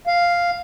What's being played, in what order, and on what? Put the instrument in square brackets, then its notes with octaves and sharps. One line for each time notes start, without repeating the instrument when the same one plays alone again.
[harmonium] F5